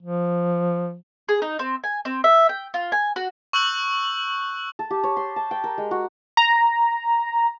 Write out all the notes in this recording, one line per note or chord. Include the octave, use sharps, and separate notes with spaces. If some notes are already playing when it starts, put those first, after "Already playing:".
F3
G#4
D#4
C4
G#5
C4
E5
G5
F4
G#5
F#4
C#6 E6 F#6 G6 F#7
A4
G4
C#5
C6
A5
G5
A#4
G#3
F#4
A#5